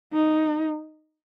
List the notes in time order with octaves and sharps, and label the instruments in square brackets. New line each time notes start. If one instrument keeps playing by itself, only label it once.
[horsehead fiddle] D#4